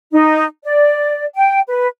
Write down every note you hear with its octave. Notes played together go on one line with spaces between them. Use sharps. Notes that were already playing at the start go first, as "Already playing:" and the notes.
D#4
D5
G5
B4